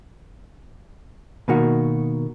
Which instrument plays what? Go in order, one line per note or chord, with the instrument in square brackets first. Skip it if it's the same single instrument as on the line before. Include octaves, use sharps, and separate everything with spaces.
[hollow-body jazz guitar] B2 D#3 A#3 F#4